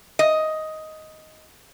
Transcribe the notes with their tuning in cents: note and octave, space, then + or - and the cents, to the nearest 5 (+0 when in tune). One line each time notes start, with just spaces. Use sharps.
D#5 +10